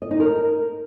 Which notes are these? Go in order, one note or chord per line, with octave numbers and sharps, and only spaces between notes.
D#5
D#4
A#4